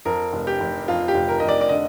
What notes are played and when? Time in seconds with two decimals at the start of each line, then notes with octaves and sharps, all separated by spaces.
0.05 F2 A#4
0.33 F1
0.47 G4
0.60 F1
0.88 F2 F4
1.08 G4
1.14 F1
1.29 A#4
1.40 F1 D#5
1.49 D5
1.61 D5
1.69 D3 D#5